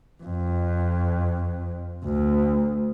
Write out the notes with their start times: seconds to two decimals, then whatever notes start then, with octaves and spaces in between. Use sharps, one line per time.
0.23 F2
2.04 D2